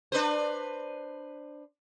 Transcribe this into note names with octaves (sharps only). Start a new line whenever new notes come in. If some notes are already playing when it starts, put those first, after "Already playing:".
D4 B4 C5